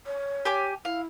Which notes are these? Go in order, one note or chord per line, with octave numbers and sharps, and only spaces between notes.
C#5
G4 G#5 D6
E4 F5